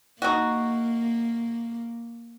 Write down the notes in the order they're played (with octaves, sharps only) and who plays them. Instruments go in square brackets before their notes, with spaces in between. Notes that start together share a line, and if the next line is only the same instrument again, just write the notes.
[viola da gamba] A#3 [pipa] D#4 F#4